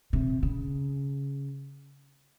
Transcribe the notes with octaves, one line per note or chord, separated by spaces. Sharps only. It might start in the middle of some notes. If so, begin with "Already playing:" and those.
C3
C#3